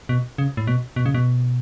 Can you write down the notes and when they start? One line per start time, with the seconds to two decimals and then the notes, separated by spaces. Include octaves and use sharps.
0.09 B2
0.38 C#3
0.57 A2
0.67 B2
0.96 B2
1.06 C#3
1.14 B2